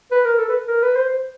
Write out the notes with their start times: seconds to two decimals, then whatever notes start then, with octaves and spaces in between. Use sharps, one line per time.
0.12 B4
0.25 A#4
0.39 A4
0.49 B4
0.67 A#4
0.83 B4
0.96 C5
1.10 C5